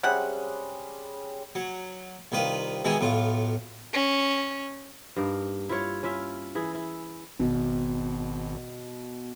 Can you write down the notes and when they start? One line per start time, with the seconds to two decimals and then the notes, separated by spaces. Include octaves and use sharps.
0.03 C3 G3 G#3 C#4 F#5
1.55 F#3
2.32 C2 D#3 F4 B4
2.84 B2 D#3 E3 G#3 E4
3.00 B1 A2 F4
3.93 C#4
5.16 G2 A#3 D#4
5.69 E4 F4 C#5
6.03 C#4 E4 F4 E5
6.55 E3 E4 G#4
6.75 E4
7.40 G#1 B2